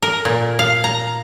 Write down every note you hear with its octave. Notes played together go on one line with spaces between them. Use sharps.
A#4
A#2
F5
A#5